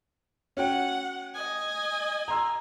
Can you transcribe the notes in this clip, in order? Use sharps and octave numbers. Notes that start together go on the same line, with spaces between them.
C#4 F#4 F#5 G5
D#5 G#5
A#5 C6 E6